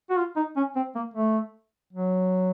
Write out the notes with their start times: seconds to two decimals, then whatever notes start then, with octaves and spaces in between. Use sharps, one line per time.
0.10 F#4
0.17 F4
0.36 D#4
0.56 C#4
0.76 C4
0.95 A#3
1.14 A3
1.93 F#3